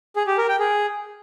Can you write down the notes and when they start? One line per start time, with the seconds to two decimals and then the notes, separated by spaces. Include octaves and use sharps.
0.16 G#4
0.27 G4
0.38 A#4
0.49 G5
0.59 G#4